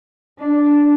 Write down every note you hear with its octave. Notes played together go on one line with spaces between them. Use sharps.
D4